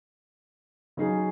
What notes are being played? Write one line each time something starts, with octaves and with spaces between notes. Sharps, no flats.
C#3 F#3 D#4 G#4